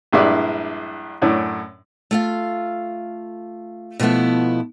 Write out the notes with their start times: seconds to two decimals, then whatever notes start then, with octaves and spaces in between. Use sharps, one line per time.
0.12 A#1 G2 G#3 E4 D5
1.22 F#2 A2 C#4 D4
2.11 A3 F4 F5
3.99 B2 F3 A3 B3 E4